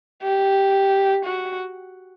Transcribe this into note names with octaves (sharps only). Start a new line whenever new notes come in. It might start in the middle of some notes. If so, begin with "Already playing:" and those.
G4
F#4